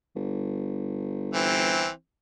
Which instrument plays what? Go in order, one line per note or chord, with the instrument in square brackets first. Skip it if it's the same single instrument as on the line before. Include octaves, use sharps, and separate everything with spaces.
[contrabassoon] G1
[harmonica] E3 C4